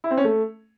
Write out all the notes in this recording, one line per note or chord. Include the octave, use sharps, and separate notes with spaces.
E4
C4
C#4
A3